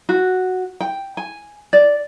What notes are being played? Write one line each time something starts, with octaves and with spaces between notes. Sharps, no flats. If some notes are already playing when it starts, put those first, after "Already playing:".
F#4
G5
G#5
D5